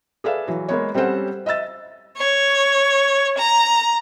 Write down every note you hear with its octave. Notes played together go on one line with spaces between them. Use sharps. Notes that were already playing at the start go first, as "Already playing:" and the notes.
G#4 A4 B4 D5 E5 F5
E3 F#3
G#3 A#3 B3 C#5
G3 C4 C#4 A4 C5 F#5
D#5 E5 E6 A6
C#5
A#5